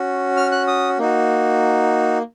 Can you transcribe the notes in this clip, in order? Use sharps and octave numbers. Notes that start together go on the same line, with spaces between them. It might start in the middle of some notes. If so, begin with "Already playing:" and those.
Already playing: C#4 F#4
F6
F#6
D#6
A#3 D#4 F#4